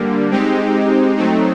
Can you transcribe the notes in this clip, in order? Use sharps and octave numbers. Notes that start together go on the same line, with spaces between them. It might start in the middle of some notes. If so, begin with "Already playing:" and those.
Already playing: D3 G3 A#3
G#3 C4 D#4 G4
F#3 A3 C4 D#4